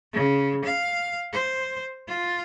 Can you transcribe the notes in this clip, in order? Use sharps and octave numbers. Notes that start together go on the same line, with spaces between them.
C#3
F5
C5
F4